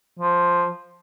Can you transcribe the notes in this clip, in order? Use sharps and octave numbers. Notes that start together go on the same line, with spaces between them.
F3